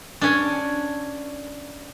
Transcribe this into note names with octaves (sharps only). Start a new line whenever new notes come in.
C#4 D4